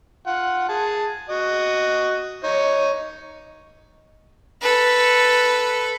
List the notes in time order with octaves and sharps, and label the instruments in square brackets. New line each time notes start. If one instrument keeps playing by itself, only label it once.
[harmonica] F4 F#5
G#4 A5
F#4 D#5
D#4 C#5
[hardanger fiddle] A4 B4